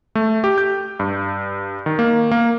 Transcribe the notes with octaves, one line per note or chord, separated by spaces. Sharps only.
A3
G4
G6
G2
D#3
A#3
A#3